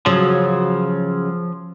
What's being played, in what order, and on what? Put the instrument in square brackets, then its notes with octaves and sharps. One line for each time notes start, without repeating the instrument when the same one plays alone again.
[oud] C#3 F#3 [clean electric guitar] F3